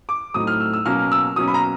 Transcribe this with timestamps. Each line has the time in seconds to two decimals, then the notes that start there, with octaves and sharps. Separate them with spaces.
0.09 D6
0.34 A2 F#3 A3 C4 D#4 D#6
0.47 F6
0.60 E6
0.73 E6
0.85 B2 F#3 A#3 C#4 F6
1.12 E6
1.36 B2 F#3 A#3 C#4 D#6
1.48 B5
1.54 A#5